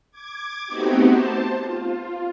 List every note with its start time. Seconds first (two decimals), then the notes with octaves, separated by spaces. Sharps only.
0.11 D6 G#6
0.66 A3 B3 C4 D#4 F#4 G4
1.05 C5 A5
1.63 F4